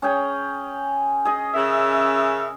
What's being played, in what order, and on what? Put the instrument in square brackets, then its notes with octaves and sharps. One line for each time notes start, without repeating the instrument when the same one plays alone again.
[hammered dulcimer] C#4 G#4 G5
G#4 D#5
[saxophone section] C#3 A#4 E5